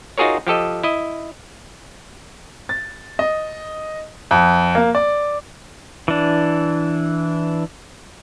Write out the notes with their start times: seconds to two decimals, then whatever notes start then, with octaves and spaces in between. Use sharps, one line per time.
0.18 D#4 F4 F#4 G#4 A#4 C#5
0.47 F3 G4 A4 D#5
0.83 E4 D#5
2.69 A6
3.19 D#5
4.31 F2
4.75 A#3
4.95 D5
6.08 E3 D4